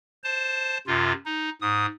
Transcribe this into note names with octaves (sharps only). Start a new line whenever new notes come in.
C5 A5
F#2 C3 F4
D#4
G#2 D#6